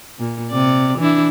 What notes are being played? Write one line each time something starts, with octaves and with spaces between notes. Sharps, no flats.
A#2
C3 D5
E3 D4 E4